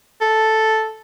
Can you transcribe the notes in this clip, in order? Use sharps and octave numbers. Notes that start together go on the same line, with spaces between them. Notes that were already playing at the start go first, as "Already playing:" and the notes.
A4